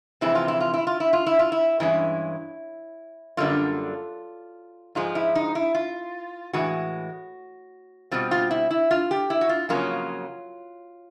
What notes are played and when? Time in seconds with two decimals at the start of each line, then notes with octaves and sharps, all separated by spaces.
0.21 F2 C3 E3 G#3 C4 E4
0.35 F4
0.48 E4
0.60 F4
0.74 E4
0.87 F4
1.00 E4
1.13 F4
1.27 E4
1.39 F4
1.52 E4
1.80 G2 E3 G#3 C#4 E4
3.37 F#2 D3 G3 A#3 D4 F4
4.95 G#2 F3 G#3 F4
5.15 E4
5.35 D#4
5.55 E4
5.75 F4
6.53 A2 E3 G#3 F#4
8.11 B2 G3 C4 F4
8.31 F4
8.51 E4
8.71 E4
8.91 F4
9.11 G4
9.30 E4
9.41 F#4
9.49 F4
9.69 F2 C#3 F#3 A#3 C#4 F4